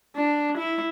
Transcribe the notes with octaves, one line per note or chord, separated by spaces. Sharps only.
D4
E4